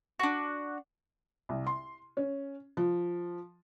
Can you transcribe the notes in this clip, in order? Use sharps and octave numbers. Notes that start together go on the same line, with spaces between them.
D4 F#4
C2
C6
C#4
F3